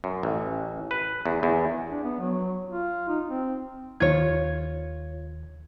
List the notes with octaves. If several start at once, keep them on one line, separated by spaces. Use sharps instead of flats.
F#2
A1
B4
E2
E2
D4
B3
F#3
F4
D#4
C4
D#2 F4 C#5 G#6